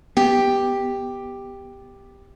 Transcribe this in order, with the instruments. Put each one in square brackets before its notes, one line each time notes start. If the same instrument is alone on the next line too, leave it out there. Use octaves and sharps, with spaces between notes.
[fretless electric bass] B3 [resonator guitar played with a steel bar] G4